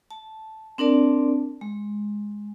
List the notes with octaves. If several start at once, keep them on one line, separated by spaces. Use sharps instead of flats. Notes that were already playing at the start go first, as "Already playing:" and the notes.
A5
C4 D4 A#4 D5 A5
G#3